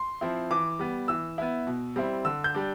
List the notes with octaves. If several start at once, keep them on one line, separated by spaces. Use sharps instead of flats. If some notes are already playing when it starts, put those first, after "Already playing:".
Already playing: C6
F3 C4 E4
E3 D6
G3 B3
E3 E6
B3 E4
B2
G3 C4 E4
D3 E6
G6
G3 D4